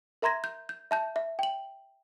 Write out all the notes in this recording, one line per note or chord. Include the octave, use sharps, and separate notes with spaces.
A#4 E5 A#5 C6 G#6 A#6
G6
G6
E5 A5 G6
E5
G5 F#7